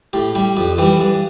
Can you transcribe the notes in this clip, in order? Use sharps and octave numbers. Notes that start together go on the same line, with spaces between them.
A2 G4
G3 G4
F2 G4
E3 G3 G4
G2